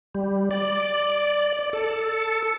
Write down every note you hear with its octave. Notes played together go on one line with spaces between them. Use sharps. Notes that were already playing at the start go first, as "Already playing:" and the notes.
G3
D5
D5
A4